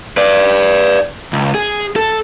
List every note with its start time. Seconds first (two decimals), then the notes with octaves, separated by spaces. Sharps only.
0.17 B4 D5
1.33 C#2
1.54 G#4
1.96 A4